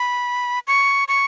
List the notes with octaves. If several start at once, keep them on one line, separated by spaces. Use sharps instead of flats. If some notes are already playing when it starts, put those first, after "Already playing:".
Already playing: B5
C#6
C#6